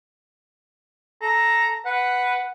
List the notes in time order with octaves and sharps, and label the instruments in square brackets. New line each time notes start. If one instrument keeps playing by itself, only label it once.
[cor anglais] A4 [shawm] A#5
[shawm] B4 [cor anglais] F#5